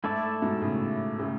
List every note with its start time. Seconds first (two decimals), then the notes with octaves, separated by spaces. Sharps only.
0.04 G#2 A3 E4 A4 D5
0.42 G#2 B2
0.62 A2 C#3
1.19 A2 C#3